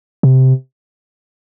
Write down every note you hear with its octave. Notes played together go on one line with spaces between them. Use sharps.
C3